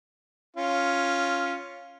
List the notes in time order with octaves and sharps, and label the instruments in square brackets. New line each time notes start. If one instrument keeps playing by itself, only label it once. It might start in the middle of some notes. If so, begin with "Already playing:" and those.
[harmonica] C#4 F4